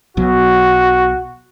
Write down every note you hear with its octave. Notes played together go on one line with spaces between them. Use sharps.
B1 B2 F#3 F#4